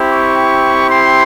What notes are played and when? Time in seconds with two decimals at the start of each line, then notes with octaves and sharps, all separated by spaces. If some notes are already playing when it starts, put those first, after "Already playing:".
Already playing: C4 E4 G4
0.09 C#6
0.90 C6